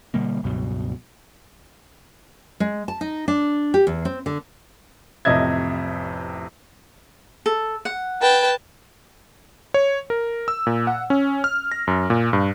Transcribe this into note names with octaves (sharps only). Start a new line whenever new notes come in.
B2 D3 G3 A#3
C#2 G2 B2 F#3
G#3
A5
D#4
D4
G4
E2
C4
D3
A1 F2 C3 D#5 E5 G#6
A4
F#5
B4 G5 A5
C#5
A#4
E6
A#2
F#5
C#4
F6
A#6
F#2
A#2
G2